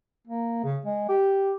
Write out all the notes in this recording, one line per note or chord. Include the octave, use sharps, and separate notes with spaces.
A#3
C#3
G#3
G4